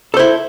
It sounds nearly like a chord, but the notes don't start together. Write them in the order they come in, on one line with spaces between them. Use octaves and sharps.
A4 C5 E4